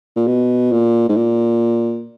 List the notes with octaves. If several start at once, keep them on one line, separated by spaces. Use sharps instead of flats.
A#2
B2
A#2
G#2
A#2